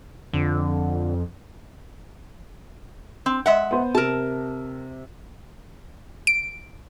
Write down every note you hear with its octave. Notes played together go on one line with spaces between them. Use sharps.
F2 D3
C4
G#3 E5 F#5
B3 C5
C3 A#4 A5
D7